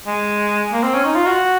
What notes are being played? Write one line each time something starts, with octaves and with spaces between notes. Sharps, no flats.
G#3
A#3
C4
C#4
D#4
F4
F#4